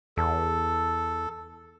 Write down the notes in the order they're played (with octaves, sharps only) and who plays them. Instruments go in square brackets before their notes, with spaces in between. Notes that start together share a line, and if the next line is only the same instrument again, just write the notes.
[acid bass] E2 [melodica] A4